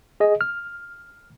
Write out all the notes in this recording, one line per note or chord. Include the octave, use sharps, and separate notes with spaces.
G#4 D#5
F6